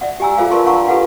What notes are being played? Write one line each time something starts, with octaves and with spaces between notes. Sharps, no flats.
D5 E5 F#5
G4 D5 G#5 A#5 E6
F4 G#4 A4 C5 E5 F5
A#4 B4 D5 A5 C6 C#6
D4 F5 F#5 A5 A#5 C#6
F4 G4 A4 B4 F5 F#5